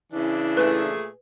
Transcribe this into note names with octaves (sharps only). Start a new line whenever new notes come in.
C#3 E3 D4 E4
A#2 A3 G#4 B4